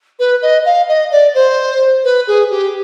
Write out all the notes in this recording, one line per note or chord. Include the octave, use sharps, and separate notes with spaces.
B4
D#5
F5
D#5
D5
C5
B4
G#4
G4